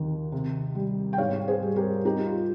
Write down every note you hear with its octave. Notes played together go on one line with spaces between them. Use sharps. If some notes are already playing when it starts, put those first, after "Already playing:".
Already playing: D#2 D#3
C3
G3
G5
G#2 C#5 F5
G#4 C5
G3
G4 A#4
D#4 G4
F4